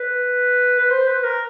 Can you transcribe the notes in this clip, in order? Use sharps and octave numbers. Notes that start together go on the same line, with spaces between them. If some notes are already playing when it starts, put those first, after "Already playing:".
Already playing: B4
B4
C5
B4
A#4